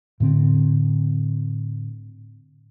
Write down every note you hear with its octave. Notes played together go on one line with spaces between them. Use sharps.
A2 D3 C4